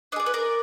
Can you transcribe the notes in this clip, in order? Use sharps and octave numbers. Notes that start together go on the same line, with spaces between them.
D4 G#4 D5 D#5
B4
A#4 D5